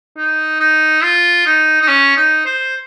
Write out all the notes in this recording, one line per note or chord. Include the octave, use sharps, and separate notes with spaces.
D#4
D#4
F4
D#4
D#4
C#4
D#4
C5